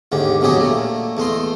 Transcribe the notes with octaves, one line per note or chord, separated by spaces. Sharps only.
D#2 G#2 D3 G4
A#1 B2 F#3 G4 G#4 D#5
A#2 A3
E2 A3 D#5 C6